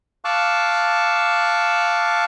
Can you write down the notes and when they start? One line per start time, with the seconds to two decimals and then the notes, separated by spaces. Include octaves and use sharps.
0.25 F5 A5 C#6 D6 E6 F#6